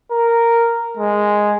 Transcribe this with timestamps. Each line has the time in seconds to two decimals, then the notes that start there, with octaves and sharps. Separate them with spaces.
0.12 A#4
0.97 G#3